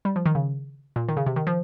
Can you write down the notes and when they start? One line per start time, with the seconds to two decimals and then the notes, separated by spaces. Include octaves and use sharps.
0.05 G3
0.16 F3
0.26 D#3
0.35 C#3
0.96 A#2
1.08 D#3
1.17 C#3
1.26 C3
1.36 D#3
1.47 F3